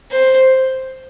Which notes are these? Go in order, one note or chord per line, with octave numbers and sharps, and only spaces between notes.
C5